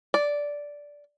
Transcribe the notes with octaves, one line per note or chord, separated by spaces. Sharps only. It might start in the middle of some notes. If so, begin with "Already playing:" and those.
D5